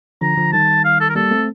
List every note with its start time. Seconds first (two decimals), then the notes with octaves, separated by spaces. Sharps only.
0.21 D3 F3 A#5
0.37 D3 F3
0.52 D#3 G3 A5
0.85 F5
1.00 A4
1.09 A#4
1.16 G3 A#3 A4
1.31 A3 C4